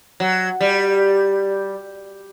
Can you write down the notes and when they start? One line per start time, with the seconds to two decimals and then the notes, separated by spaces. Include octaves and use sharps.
0.20 F#3
0.61 G3